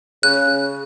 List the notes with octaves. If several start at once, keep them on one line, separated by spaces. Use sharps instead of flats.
C#3 F#6